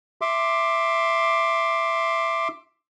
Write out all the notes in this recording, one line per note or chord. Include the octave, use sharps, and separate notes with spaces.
E5 C6 D6